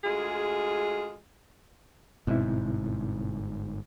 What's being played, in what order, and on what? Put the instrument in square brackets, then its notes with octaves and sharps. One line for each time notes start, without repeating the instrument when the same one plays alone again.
[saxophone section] D2 G#3 F4 G#4
[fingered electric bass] G1 G#2 [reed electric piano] B2 C4 E4